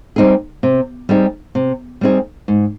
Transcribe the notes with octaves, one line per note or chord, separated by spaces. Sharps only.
G3 C4 D#4 G#4
C3
G3 C4 D#4 G#4
C3
G3 C4 D#4 G#4
G#2